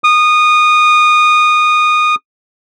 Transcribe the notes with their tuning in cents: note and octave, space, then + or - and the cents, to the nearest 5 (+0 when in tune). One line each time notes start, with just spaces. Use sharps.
D#6 -20